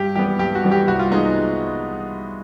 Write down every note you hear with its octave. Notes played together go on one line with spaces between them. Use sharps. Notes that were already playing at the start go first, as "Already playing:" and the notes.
Already playing: G2 G4
E3 G3 B3 G4
G2 G4
F#4
E3 G3 B3
G4
C2 F#4
F4
G#3 B3 D#4